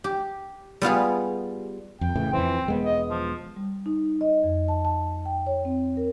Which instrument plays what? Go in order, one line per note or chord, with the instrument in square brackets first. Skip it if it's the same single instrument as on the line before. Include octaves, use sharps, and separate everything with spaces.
[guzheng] G4
G3 B3 F4 G#4
[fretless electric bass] F2 [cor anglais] G5
[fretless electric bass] A2 C#3 E3
[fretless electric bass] F2 E3 [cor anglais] C4
[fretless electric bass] E1 G#3 B3
[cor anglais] D#5
F3
[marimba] G3
D#4
D#5
F2
A5
A5
G5
C#5
C4
A#4